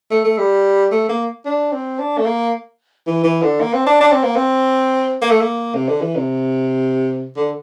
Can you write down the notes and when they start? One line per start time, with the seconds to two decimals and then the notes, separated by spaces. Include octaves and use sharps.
0.11 A3
0.24 A3
0.38 G3
0.92 A3
1.09 A#3
1.46 D4
1.72 C4
1.99 D4
2.18 A3
2.26 A#3
3.07 E3
3.24 E3
3.43 D3
3.61 A#3
3.74 C4
3.86 D4
4.01 D4
4.12 C4
4.23 A#3
4.36 C4
5.21 A#3
5.31 A3
5.41 A#3
5.75 C3
5.88 D3
6.01 E3
6.16 C3
7.37 D3